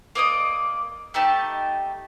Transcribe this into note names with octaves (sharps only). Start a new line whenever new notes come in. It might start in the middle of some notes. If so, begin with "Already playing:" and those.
A#3 D5 D#5 D#6
A3 D#4 G4 A5